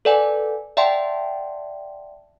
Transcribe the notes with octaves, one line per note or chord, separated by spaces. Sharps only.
A4 B4 D5 F#5 G#5
D5 E5 F#5 G5 A5 C6